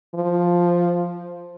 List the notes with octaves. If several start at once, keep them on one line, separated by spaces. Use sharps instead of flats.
F3